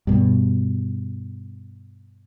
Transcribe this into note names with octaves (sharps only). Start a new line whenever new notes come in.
G2 B2